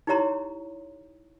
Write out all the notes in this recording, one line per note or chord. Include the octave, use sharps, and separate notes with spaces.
D#4 E4 G4 C#5 A#5 C6